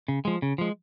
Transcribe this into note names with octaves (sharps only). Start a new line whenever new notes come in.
C#3
F3 G#3
C#3
F3 G#3